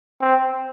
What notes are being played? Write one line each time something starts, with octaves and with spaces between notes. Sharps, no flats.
C4